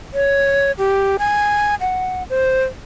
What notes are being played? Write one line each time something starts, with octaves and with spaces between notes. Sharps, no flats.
C#5
G4
G#5
F#5
C5